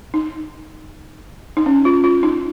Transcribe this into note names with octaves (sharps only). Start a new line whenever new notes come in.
D#4
D#4
C#4
F4
F4
D#4